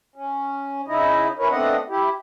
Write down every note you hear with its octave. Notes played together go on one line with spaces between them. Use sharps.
C#4
C#3 D#4 E4 D#5
C#4 E4 A#4 B4 C#5
A3 B3 C4 D4 D#5 F#5
E4 G4